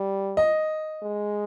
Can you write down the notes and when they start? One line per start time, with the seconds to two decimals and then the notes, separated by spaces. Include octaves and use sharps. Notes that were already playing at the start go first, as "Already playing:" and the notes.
Already playing: G3
0.37 D#5
1.03 G#3